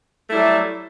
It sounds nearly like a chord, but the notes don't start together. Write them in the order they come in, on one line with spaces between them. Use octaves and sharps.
A3 E4 G3 F#3